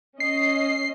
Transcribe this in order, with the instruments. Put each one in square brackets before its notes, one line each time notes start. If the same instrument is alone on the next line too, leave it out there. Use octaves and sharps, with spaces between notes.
[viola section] C#4 D#5 [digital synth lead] C7